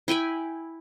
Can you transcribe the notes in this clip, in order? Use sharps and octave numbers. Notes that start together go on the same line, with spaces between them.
E4 G5 G#5 B5